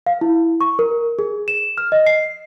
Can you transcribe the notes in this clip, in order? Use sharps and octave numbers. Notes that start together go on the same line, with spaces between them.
F5
E4
C#6
A#4
G#4
E7
F6
D#5
C7